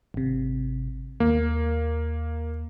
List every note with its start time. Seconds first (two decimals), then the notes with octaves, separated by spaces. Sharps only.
0.14 G#1 C3
1.20 D#2 A#3